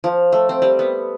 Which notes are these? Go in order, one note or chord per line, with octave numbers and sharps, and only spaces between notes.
F3
A3
C4
G3
B3